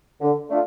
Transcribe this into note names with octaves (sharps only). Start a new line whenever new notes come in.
D3
A3 D4 F4